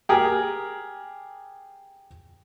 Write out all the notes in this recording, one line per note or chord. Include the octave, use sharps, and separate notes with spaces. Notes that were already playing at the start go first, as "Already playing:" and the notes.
G4 G#4 A#4